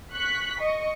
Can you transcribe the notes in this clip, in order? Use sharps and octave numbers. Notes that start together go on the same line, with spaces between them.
C#6 F#6 B6
D#5 C#6